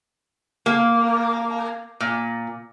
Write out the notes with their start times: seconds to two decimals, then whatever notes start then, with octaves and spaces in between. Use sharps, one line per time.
0.66 A#3
2.00 A#2